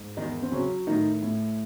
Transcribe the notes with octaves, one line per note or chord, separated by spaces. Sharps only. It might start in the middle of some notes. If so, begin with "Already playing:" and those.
Already playing: G#2
E2 D#3 D#4
C4
C#3 F#3 C#4
A2 D#3 D#4
A2